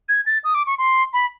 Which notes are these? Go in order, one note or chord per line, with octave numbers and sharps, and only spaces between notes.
G#6
A6
D#6
D6
C#6
C6
B5